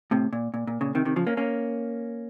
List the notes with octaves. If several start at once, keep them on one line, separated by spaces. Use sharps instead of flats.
A2 C3
A#2
A#2
A#2
A#2 C#3
C3 D#3
C3 D#3
C#3 F3
A#3 C#4
A#3 C#4